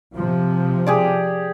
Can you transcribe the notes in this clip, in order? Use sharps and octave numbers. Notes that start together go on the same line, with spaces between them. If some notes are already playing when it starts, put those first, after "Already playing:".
C3 F3
G4 G#4 D5